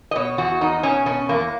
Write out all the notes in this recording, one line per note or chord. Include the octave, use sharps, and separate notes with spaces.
D#5
B2 C#5
E2 F#4
E2 D#4
B2 C#4
B2 C#4
E2 A#3